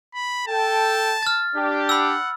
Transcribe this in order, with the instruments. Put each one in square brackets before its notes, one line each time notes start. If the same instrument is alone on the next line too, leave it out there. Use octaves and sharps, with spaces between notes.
[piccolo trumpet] B5
[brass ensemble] A4 G5 [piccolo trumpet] A5
[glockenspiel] F6 A6
[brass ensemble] D4 G4
[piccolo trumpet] F#5 [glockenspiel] B5 E6